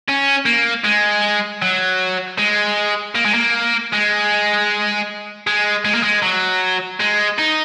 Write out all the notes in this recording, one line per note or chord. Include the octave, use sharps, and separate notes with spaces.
C#4
A#3
G#3
F#3
G#3
A#3
G#3
A#3
G#3
G#3
G#3
A#3
G#3
F#3
G#3
D#4